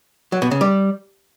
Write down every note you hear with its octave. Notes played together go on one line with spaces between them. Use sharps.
F#3
B2
C#3
G3